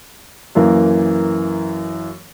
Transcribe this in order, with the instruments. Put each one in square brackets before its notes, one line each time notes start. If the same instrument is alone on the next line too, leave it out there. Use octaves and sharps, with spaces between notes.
[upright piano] F#2 E3 A#3